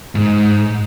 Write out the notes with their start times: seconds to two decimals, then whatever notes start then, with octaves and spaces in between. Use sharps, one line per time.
0.15 G#2